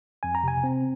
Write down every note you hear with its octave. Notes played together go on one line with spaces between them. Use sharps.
F2 G#5
A#5
C3 G#5
C4